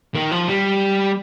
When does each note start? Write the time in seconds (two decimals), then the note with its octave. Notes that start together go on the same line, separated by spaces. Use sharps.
0.15 D#3
0.31 F3
0.48 G3